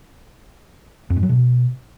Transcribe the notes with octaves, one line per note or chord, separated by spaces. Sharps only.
F2
G#2
F#3
B2